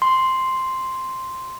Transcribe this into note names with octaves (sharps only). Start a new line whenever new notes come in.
C6